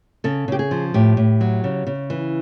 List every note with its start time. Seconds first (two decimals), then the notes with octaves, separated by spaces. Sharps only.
0.24 C#3 A4
0.48 C#3 G4
0.59 G#4
0.71 F3
0.94 A2 G4
1.17 A2
1.41 F#3
1.64 C#3
1.87 C#3
2.10 E3